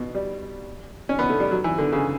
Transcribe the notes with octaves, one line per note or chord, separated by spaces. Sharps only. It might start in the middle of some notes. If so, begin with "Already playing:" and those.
Already playing: B2
G3
C#4
B3
A3
G3
F#3
E3
D3
C#3